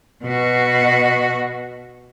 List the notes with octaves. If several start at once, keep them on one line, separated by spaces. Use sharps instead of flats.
B2 F#4